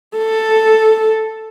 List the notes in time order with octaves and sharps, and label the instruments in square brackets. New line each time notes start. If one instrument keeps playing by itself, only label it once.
[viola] A4